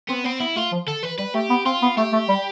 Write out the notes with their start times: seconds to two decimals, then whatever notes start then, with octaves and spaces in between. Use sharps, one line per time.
0.09 B3 C4
0.24 B3 C4
0.40 B3 E4
0.56 A3 F4
0.72 F3
0.87 D3 A4
1.03 E3 B4
1.19 G3 B4
1.35 A3 G4
1.50 B3
1.65 C4 F4
1.82 B3
1.97 A3 G4
2.13 A3
2.28 G3